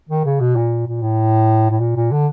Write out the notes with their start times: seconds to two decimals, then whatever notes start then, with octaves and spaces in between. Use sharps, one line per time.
0.09 D#3
0.25 C#3
0.40 B2
0.56 A#2
0.87 A#2
1.02 A2
1.70 A2
1.80 A#2
1.96 A#2
2.11 D3